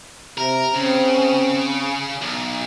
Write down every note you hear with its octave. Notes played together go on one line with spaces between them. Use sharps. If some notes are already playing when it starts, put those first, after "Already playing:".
C3 A#4
C#3 C4 C#4
B1